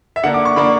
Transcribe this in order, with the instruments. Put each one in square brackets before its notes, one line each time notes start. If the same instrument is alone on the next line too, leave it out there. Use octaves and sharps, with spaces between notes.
[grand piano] E5
D3 A#3 D4 F#5
D6
C#6
D3 A#3 D4 B5